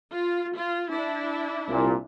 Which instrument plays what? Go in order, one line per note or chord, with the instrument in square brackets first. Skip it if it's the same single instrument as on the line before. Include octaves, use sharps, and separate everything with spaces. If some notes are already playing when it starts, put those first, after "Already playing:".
[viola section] F4
F4
D4 E4
[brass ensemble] C2 A#2